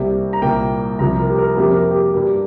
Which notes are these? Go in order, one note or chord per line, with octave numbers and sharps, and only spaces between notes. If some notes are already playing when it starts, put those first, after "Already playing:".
Already playing: C2 C3 G3 A#3
A#5
C2 A#2 A#3 G5
C2 C3 F3 A#5
A#4
G4
A#4
F2 C3 F3 A#3 G4
A#4
G4
A#4
G2 G3 A#3